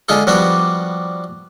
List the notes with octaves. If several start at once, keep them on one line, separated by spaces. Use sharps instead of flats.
D3 G#3 F4 G#4 A4
F3 G3 B3 D4 F#4 G4